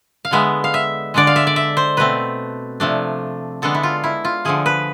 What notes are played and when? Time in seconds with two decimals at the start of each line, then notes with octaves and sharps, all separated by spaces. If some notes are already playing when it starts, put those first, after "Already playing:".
0.25 F5
0.31 D3 G#3 B3 E5
0.64 F5
0.74 E5
1.14 D3 G#3 D4 D5
1.27 F5
1.36 E5
1.47 D5
1.56 E5
1.77 C5
1.97 B2 A3 C4 B4
2.80 C3 F3 A3 D4
3.62 D3 G#3 B3 D4 A4
3.74 E4
3.83 F4
4.04 E4
4.25 F4
4.45 D3 F3 A3 G#4
4.66 B4